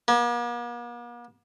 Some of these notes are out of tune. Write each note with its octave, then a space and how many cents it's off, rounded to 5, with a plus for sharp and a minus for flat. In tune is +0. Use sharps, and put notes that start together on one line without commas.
A#3 +45